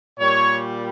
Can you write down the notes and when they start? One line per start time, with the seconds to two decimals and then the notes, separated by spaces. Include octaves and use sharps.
0.20 A#2 G3 C#5